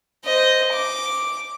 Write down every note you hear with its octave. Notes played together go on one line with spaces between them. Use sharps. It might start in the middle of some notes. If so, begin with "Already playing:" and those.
C5 D#5
D6